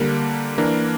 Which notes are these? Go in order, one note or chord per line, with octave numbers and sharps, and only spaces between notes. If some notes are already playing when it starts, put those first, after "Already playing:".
Already playing: D3 G3 A#3 D4 A#4
E3 A#3 D4 A#4